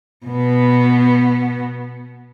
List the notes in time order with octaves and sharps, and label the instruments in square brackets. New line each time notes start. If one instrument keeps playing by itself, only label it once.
[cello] B2 B3